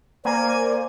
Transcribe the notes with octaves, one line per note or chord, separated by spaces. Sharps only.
A#3 C5 D5 G#5